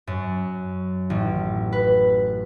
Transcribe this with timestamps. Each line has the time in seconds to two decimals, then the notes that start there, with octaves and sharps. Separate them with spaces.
0.07 F#2
1.10 A1
1.72 B4